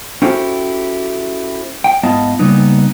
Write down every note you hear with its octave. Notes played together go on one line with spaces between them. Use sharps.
C#4 E4 F#4 G4 A4 C5
G5
G#2 B3 E4 D#5 F5 A5
C#3 G3 A#3 B3 D#4